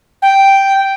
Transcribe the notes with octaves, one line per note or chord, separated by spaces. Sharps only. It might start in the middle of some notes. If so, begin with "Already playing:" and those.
G5